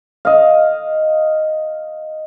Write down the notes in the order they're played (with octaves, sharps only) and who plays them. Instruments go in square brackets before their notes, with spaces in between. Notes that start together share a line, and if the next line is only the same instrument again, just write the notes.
[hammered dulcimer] D#5 F5